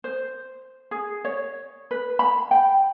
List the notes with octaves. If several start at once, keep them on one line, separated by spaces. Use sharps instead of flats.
C5
G#4
C#5
B4
B5
G5